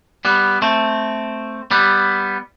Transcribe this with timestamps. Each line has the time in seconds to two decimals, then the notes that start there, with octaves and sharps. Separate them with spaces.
0.25 G3 B3
0.62 A3 C4
1.71 G3 B3